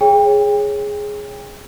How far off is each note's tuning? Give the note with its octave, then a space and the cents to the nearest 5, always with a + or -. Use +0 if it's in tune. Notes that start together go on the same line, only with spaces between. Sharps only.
G#4 +0 C#5 -10 G5 +30